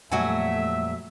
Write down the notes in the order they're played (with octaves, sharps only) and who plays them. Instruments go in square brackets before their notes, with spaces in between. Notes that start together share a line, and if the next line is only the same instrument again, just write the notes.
[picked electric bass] F2 A#2 G3 [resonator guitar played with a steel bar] F#3 F#5 G#5 [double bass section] A3 [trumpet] E5